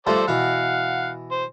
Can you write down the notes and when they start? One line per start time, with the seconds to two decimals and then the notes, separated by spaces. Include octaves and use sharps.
0.07 G2 F3 A3 A4 C5 D5
0.28 B2 E3 F5 F#5
1.31 C5